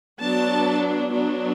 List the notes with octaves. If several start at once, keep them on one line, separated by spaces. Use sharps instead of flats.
F#3 B3 D4 A5
F#3 B3 D4